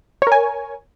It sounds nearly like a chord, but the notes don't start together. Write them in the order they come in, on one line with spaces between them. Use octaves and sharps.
C#5 A#4 G#5